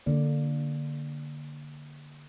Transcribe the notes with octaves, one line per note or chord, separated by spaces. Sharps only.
D3 A#3 D5